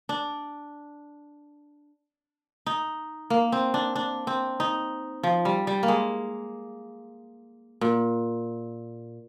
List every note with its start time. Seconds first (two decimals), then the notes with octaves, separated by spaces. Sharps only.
0.09 D4
2.66 D#4
3.30 A#3
3.52 C4
3.74 D4
3.96 D4
4.27 C4
4.60 D#4
5.23 F3
5.45 G3
5.67 G3
5.83 A#3
5.88 G#3
7.81 A#2